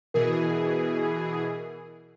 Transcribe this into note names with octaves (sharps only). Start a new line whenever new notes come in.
B2 E3 G#4 A#4